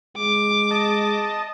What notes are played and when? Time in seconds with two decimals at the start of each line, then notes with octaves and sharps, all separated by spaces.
0.17 G#3 D6
0.71 D#5 A5